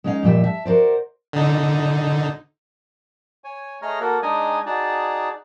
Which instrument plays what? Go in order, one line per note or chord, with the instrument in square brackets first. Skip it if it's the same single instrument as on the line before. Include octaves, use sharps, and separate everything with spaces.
[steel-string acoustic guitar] G#3 C#4 D#4 E4 F5
F2 A#2 G3 E5
E5 A5
F#4 A#4 C5 D5
[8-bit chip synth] D3 D#4
[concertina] C#5 G#5
A3 G#4 C#5 D#5 A#5 F6
A#3 F#4 A4 A#4
G#3 D4 D#4 D#5 G#5
D#4 F#4 G#4 D5 A5